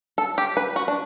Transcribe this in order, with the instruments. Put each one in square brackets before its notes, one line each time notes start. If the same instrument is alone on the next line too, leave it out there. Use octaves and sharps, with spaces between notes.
[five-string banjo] A4
G4
B4
F#4
D4